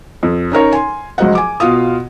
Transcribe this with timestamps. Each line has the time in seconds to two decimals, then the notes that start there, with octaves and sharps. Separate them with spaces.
0.23 F2
0.52 C#4 D#4 A#4 C#5
0.72 G#5 C6
1.18 C#2 F3 F#3 C5 D#5 F#5
1.35 G#5 D6
1.60 B2 F4 F5 D#6